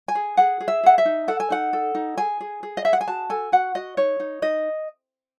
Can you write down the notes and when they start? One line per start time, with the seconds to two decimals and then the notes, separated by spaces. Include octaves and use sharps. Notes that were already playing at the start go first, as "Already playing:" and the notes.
0.08 G#5
0.15 G#4
0.37 G#4 F#5
0.61 G#4
0.68 E5
0.83 G#4 F#5
0.98 E5
1.05 D#4
1.28 A4 F#5
1.40 G#5
1.50 D#4 F#5
1.73 A4
1.95 D#4
2.18 G#4 G#5
2.41 G#4
2.63 G#4
2.77 D#5
2.85 G#4 E5
2.93 F#5
3.01 G#5
3.07 F#4 A5
3.30 A4 G#5
3.52 F#4 F#5
3.75 F#4 D#5
3.97 D#4 C#5
4.20 D#4
4.42 D#4 D#5